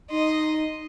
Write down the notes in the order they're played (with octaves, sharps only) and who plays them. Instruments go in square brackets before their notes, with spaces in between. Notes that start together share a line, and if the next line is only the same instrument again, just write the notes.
[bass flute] D#4 [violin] D#5 C6